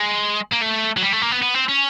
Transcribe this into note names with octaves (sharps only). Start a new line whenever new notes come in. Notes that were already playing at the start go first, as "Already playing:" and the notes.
Already playing: G#3
A#3
A3
F#3
G3
A3
A#3
B3
B3
C4
C#4